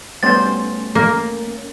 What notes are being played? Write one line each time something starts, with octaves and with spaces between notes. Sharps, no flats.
G3 A3 B3 C#4 C5 A6
A#3